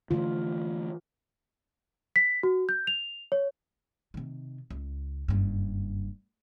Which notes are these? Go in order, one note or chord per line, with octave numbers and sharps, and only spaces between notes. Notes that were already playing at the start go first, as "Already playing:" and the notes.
D3 E3 A3 F4
B6
F#4
G6
F7
C#5
C3 D#3
C#2
F#1 G2